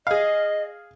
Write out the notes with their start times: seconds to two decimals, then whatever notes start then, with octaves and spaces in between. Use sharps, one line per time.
0.07 G#4 D#5 F5